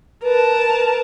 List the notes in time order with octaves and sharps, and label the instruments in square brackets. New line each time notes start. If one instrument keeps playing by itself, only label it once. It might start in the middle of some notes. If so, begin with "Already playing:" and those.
[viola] A#4 A5 [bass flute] B4